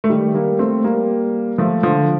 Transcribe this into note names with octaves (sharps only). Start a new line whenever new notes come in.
A3
D#3 G3
G3 A#3
A3 C4
G3 A#3
F3 A3
D3 F3